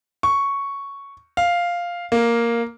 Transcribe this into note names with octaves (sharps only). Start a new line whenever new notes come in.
C#6
F5
A#3